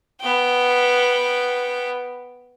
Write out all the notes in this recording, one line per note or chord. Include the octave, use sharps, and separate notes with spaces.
B3 G5